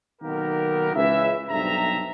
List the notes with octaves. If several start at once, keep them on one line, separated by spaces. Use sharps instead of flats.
B1 D#3 A#3 B3 G4 A#4
C#2 E3 E5
B1 G2 C3 A4 E5 A#5